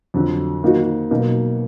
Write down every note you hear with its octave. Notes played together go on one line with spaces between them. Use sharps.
F2 D3 F#3
D#3 A#3 D#4 F#4
B2 F#3 A#3 D#4